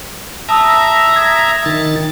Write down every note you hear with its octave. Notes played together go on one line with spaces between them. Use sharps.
E5 A5 A#5 D#6 E6
D#6 G#6 B6
D#3 A6